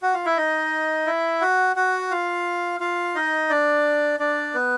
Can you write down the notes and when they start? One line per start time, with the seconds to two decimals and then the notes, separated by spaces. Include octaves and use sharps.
0.02 F#4 F#5
0.14 F4 F5
0.25 E4 E5
0.37 D#4 D#5
1.06 E4 E5
1.41 F#4 F#5
1.76 F#4 F#5
2.11 F4 F5
2.80 F4 F5
3.15 D#4 D#5
3.50 D4 D5
4.19 D4 D5
4.54 B3 B4